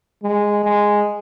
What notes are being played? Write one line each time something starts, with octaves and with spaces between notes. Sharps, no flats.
G#3
G#3